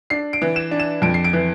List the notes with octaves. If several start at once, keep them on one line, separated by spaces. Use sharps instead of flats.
D4 C7
D7
E3
E7
D4
E7
F2 D7
C7
D7
E3